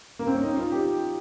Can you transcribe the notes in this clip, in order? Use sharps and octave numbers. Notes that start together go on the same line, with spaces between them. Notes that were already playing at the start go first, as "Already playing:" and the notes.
A#3
C4
C#4
D#4
F4
G4